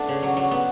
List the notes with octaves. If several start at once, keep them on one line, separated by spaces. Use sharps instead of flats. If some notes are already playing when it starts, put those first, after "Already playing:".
Already playing: A3 B3 D4
C#3
F#3
F#3
B3